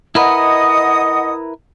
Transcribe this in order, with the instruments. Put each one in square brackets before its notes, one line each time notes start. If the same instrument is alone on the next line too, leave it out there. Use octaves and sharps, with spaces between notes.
[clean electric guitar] E4 A#4 B4 [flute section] D#5 F#5 [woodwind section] D#6